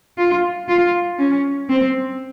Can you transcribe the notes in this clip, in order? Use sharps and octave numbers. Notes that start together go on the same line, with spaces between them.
F4
F4
C#4
C4